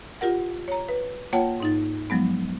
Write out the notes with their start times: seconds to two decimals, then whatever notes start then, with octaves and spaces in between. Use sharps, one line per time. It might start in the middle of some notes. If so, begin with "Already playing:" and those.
0.21 F4 G4 A#4 F#5
0.68 C#5 A#5
0.89 B4
1.33 A#3 F4 C#5 F#5 G5 A5
1.60 G#2 D#4 A6
2.10 F3 F#3 G#3 B3